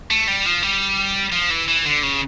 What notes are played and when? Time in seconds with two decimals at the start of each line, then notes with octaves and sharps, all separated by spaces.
0.10 A3
0.28 G3
0.46 F3
0.63 G3
1.32 F3
1.51 E3
1.68 E3
1.85 D3
2.03 C#3